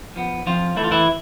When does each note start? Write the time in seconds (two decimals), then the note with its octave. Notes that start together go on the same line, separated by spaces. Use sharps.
0.16 F3 B3
0.46 F2 F3 F4
0.77 E3 A3 E4
0.84 F4
0.91 E3 E4